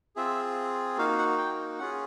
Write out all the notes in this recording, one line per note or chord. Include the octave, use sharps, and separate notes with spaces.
C4 F4 G#4 E5
A#3 D#4 F#4 F5
F#5
G5
C#4 F4 G#4 F#5